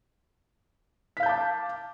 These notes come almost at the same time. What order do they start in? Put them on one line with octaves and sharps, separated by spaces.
B6 F5 G6 A5 D6